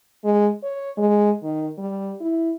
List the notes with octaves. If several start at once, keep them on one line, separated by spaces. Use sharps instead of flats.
G#3
C#5
G#3
D#3
G3
E4